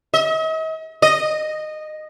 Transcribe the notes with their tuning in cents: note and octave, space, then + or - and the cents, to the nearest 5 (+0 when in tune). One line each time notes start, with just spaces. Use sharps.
D#5 +45
D#5 -15